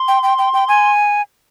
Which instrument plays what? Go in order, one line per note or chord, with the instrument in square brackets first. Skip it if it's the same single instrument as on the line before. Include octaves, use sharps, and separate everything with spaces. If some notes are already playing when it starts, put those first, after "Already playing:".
Already playing: [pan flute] C6
[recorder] G5
G5
G5
G5
G#5